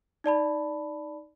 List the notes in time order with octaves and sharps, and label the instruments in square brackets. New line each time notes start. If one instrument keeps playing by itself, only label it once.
[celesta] D#4 D5 A5 B5